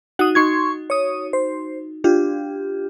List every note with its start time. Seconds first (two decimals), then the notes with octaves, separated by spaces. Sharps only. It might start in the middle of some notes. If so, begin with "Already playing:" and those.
0.19 D#4 F#4 F#5 D#6
0.35 D#4 F#4 C6 C#6 G#6
0.90 C#5 D#6
1.33 C5
2.04 D4 F4 G4